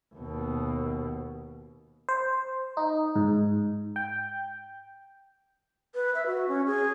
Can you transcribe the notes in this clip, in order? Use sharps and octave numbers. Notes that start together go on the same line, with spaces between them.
D#2 B2
C5
D#4
G#2
G5
B4
E5
F#4
C#4
G#4